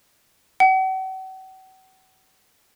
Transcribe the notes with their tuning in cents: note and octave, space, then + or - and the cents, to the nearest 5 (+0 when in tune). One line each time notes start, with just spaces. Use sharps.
F#5 +40